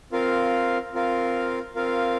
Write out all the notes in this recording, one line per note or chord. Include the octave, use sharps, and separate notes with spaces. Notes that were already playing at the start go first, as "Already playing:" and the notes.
C4 F4 A#4 F5
C4 F4 A#4 F5
C4 F4 A#4 F5